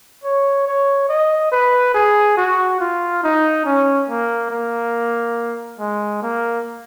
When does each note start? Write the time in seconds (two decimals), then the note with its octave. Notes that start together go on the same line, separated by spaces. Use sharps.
0.24 C#5
0.67 C#5
1.09 D#5
1.52 B4
1.95 G#4
2.37 F#4
2.80 F4
3.23 D#4
3.66 C#4
4.09 A#3
4.51 A#3
5.79 G#3
6.22 A#3